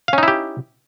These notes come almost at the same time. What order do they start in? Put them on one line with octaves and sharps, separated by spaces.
F5 C#4 D#4 E4 G4